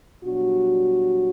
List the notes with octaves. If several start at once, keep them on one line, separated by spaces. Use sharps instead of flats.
B2 F#3 G3 D4 F#4